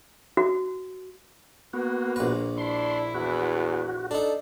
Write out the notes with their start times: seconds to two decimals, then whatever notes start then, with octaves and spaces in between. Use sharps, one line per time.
0.37 F#4
1.73 A#3 B3 F#4
2.16 A#1 B4
2.58 D4 E4 C6
3.14 E2 F#4
4.11 D4 D#4 A4